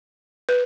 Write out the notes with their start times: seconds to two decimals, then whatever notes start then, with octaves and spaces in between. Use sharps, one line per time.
0.49 B4